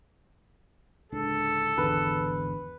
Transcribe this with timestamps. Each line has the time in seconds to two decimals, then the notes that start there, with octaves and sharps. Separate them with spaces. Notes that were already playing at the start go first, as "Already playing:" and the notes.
1.12 D1 C#2 D4 A4
1.78 G#1 E2 D3 B4